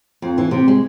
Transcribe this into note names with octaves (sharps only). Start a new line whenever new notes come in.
F2
E3
C3
G#3